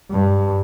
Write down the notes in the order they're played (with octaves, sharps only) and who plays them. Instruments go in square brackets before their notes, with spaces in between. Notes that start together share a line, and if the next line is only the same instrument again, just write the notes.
[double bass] G2